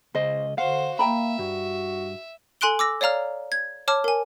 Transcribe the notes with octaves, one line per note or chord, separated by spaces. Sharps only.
C#2 C#3 C5 D#5
D3 F#4 C5 F5 F#5
A#3 E5 G5 A#5 B5
G2 F#4
A4 G#5 C6 F#6 D7 G7
D6 E6 A#6
C#5 D5 F5 A#5 F6
G#6
C#5 A5 D6 F6
A#4 G#5